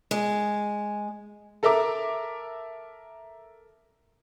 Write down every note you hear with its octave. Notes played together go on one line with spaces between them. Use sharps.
G#3
A4 A#4 E5 A#5 D6